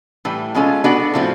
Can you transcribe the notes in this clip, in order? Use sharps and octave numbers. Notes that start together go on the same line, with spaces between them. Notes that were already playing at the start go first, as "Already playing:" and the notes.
A2 E3 G3
B2 G#3 C#4 F4 A4
B3 D4 F#4 A4 D5
A2 F3 A3 C4